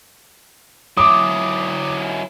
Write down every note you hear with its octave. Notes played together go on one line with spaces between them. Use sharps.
F#3 E4 D6 D#6